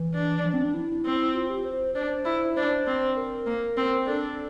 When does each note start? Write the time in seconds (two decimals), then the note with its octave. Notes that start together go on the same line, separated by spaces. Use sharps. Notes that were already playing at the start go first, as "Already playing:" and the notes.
Already playing: E3
0.14 D4
0.45 F3
0.54 C4
0.64 D4
0.74 E4
1.05 C4
1.34 F4
1.50 G4
1.65 C5
1.95 D4 C5
2.25 E4
2.56 D4 C5
2.86 C4
3.16 A#4
3.46 A#3
3.77 C4
4.07 D4 A4